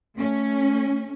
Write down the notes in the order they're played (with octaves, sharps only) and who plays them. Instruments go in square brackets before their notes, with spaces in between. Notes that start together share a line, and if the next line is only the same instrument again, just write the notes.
[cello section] A3 C#4